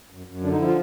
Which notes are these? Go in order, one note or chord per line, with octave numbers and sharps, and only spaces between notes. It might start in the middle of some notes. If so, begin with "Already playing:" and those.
F#2
F#2
D3 D4
D#4
F3 E4
F4